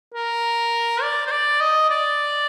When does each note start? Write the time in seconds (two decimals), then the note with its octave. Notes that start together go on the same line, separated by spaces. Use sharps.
0.14 A#4
1.02 D5
1.27 C5
1.31 D5
1.61 D#5
1.90 D5